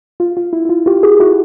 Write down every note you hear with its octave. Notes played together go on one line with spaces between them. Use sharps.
F4
F4
E4
E4
F4
F4 G4
F#4 G#4
E4 F#4